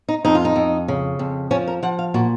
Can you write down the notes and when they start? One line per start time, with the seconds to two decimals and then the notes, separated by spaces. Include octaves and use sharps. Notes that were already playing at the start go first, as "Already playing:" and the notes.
0.09 D#4
0.25 F2 D#4
0.35 F4
0.45 D#4
0.56 F2
0.88 C#3
1.19 F2
1.51 F3 C#4
1.67 A#4
1.83 F3 F#5
1.99 F5
2.14 A#2 F#4